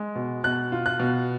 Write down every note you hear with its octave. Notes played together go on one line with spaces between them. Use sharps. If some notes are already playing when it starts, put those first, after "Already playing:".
Already playing: G#3
B2
B2 F#6
F4
F#6
B2